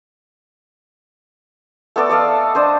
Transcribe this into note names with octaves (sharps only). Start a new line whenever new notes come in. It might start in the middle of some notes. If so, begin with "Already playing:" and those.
A3 B3 A4 D5
A4 D5 D#5 F5
D4 C5 D#5